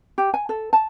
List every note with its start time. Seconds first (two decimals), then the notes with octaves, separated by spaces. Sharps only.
0.18 G4
0.34 G#5
0.49 A4
0.73 A5